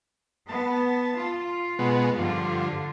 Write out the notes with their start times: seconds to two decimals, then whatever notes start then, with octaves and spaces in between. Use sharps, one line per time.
0.49 B3 A5
1.17 F4
1.79 B2 G#3 B3
2.18 G2 D3 F3 F4